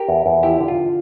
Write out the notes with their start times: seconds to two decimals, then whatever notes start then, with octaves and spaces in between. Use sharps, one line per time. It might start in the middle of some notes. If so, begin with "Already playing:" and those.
Already playing: G4 A#4
0.08 E2
0.26 E2
0.43 F3 E4 G4
0.60 D3
0.68 F4